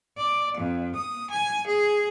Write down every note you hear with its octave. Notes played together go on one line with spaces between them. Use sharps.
D5
F2
D#6
G#5
G#4